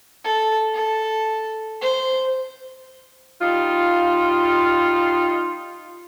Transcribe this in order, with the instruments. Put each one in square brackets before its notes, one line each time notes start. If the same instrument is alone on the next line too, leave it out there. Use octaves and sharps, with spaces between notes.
[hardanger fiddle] A4
A4
C5
[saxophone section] G3 D#4 F4